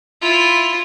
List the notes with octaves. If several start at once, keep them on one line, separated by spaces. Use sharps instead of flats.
E4 F4